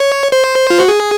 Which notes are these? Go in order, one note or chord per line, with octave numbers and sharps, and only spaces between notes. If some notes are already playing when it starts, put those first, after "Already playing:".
Already playing: C#5
C5
F4
F#4
G#4